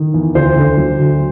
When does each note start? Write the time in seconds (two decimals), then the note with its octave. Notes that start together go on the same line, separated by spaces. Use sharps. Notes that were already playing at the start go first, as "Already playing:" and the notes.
Already playing: D#3
0.14 E2
0.35 D2 C5
0.56 D3
0.77 F#3
0.98 D2